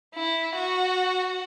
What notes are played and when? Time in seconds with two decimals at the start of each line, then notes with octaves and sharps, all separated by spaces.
0.15 E4
0.55 F#4